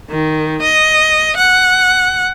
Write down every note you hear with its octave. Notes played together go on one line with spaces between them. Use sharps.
D#3
D#5
F#5